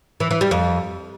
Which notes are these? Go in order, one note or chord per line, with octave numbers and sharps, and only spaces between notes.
E3
E3
G3
F2